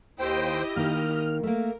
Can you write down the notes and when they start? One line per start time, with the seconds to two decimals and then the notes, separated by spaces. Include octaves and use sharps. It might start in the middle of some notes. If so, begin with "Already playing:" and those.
0.19 D#2 E4 G4 C5 D#5 G5
0.76 D#3 A#3 F6
1.43 A3 A#3 A#4